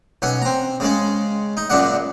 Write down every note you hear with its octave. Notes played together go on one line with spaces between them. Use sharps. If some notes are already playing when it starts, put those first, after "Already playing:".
B1 C#4 F#5
C4 A#5
C#3 G#3 C#4
D#4
F#2 A#2 C#3 D4 F#5